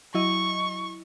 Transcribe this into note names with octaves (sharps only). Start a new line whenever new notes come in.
F#3 E4 D#5 C#6